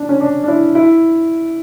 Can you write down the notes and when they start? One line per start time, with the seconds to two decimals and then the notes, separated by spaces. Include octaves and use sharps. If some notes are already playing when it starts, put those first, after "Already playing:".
Already playing: D4
0.09 C#4
0.21 D4
0.44 D4
0.48 E4
0.75 E4